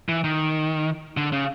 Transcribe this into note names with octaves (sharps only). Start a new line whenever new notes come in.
E3
D#3
D3
C#3